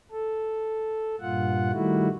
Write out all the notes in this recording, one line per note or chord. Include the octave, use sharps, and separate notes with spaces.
A4
G2 A#2 F4 F#5
D#3 G3 A3 E4 F#4